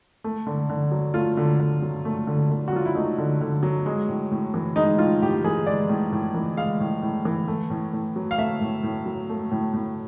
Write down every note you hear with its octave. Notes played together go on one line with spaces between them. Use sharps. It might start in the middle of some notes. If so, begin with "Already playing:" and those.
A3
D3
D3
F#3
A3 F4
D3
D3
F#3
A3
D3
D3
F#4
F#3 F4
E4
A3 D#4
D3
D3
F#3
G#3
A2
A2
E3
G#3 D#4
A2 F4
A2 G4
E3 G#4
G#3 D5
A2
A2
E3
G#3 F5
A2
A2
E3
A3
A2
A2
F#3
F5
A3 E5
A2
A2
F#3
A3
A2
A2